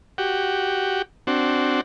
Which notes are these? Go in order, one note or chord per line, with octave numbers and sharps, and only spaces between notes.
F#4 G4
C4 D4 F#4